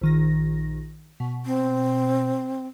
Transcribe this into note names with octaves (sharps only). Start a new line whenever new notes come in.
A#1 D#3 A#6
B2
C4